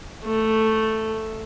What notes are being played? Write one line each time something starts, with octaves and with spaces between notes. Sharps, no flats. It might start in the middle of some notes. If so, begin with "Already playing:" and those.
A3